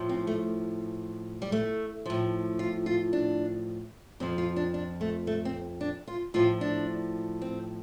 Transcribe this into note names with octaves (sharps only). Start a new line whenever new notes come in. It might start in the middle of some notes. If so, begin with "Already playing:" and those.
Already playing: A2 F3
C4
A3
G3
A3
A2 F3
F4
F4
D4
F2 F3 C4
F4
D4
D4
A3
A3
C4
D4
F4
A2 F3 F4
D4
C4